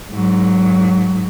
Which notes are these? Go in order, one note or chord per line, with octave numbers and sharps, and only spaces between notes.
G#2 F#3